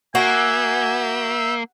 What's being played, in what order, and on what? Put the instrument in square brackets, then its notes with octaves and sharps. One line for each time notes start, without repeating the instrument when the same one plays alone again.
[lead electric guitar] A#3 [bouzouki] F#4 [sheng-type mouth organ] E5 E6 G6 [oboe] G#5